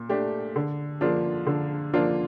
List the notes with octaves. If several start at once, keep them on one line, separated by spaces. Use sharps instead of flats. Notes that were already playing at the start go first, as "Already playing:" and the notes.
Already playing: A#2
A3 D4 G4
D3
F3 A#3 D4 F4
D3
F3 A#3 D4 F4